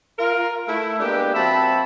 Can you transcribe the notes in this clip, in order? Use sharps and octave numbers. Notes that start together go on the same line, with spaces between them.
F4 A#4
A3 E4
G#3 A#3 B3 D4 G4
F3 C4 F#4 E5 A5 B5